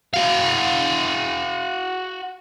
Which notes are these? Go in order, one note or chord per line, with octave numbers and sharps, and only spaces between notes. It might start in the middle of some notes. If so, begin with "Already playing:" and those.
F#4 F5